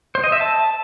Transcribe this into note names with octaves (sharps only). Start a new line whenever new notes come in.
C5
D#5
E5
A5